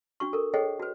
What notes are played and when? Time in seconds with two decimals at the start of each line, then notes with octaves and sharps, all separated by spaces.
0.20 D4 F#4 C#6
0.33 A4 A#4
0.54 G#4 A4 C5 C#5 D#5 G5
0.80 F#4 B4